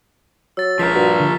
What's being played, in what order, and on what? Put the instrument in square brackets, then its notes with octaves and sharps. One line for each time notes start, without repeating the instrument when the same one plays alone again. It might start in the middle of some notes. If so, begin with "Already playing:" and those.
[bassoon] F#3 [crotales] E6 A6
[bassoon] C#2 [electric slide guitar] F3 A#4 [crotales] B6
[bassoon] G2 [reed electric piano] F#4
[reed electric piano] D3